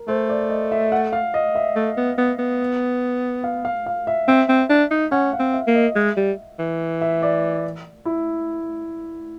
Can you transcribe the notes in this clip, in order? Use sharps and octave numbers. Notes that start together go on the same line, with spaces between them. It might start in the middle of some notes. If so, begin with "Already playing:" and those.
Already playing: A#4
A3 C5
D5
D#5
E5
F#5
F5
D#5
E5
A3
B3
B3
B3
F5
F5
F5
E5
C4 E5
C4
D4
D#4
C#4 F#5
F5
C4
E5
A#3
D#5
G#3 E5
G3
E3
E5
D5
E4